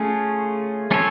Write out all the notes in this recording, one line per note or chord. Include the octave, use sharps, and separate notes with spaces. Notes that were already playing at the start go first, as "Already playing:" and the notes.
Already playing: A3 C#4 F4 G#4
A3 C#4 F4 A4 C#5